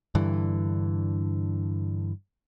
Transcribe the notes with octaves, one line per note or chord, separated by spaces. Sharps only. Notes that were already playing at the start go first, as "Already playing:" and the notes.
G2 D3 E3